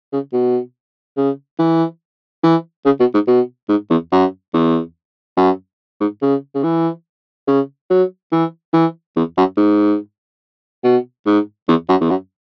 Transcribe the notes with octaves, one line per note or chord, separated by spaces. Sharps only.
C#3
B2
C#3
E3
E3
C#3
B2
G#2
B2
G#2
E2
F#2
E2
F#2
G#2
C#3
C#3
E3
C#3
F#3
E3
E3
E2
F#2
G#2
B2
G#2
E2
F#2
E2
F#2